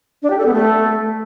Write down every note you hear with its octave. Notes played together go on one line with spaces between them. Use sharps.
D4
G4
A4
B3
A3